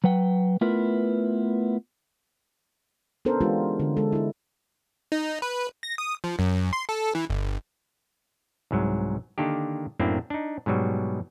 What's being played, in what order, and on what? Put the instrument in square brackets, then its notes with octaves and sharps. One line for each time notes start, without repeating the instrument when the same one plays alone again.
[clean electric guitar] F#3 B4 F#5 G5
A3 B3 E4 F4 A#4 B4
[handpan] B3 C#4 D4 A4 A#4 C5
E3 G#3 D4 F4 G4
D3
G#3 A4
D4 E4
[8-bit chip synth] D#4
B4
A#6
D#6
F3
F#2
C6
A4
E3
G1
[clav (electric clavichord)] C2 G#2 F#3
D3 D#3 A#3 D4 G4
F#2 A2 A#3 C4 D4 E4
D4 D#4
G#2 B2 F#3 G3